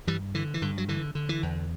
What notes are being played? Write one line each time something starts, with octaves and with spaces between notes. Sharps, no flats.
G2 E3 G3
D3 E3
E3
G2 D3
F#3
D3 E3
D3
E3
E2